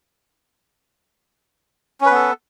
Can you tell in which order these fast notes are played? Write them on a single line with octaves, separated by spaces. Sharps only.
C#4 B4 B3 A4